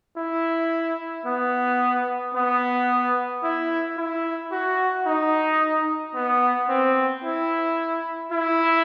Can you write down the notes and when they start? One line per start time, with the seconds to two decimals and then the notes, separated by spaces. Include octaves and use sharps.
0.17 E4
1.26 B3
2.34 B3
3.43 E4
3.98 E4
4.51 F#4
5.06 D#4
6.15 B3
6.69 C4
7.24 E4
8.32 E4